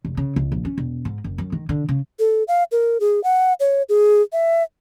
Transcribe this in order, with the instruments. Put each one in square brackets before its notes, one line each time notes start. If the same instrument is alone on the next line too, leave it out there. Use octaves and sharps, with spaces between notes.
[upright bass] F1
C#3
C#2
A#1
C#4
E1
G#2
F#1
F#2
D#3
D3
C#3
[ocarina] A4
F5
A#4
G#4
F#5
C#5
G#4
E5